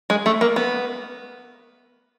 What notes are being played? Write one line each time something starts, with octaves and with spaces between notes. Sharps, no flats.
G#3
A3
A#3
B3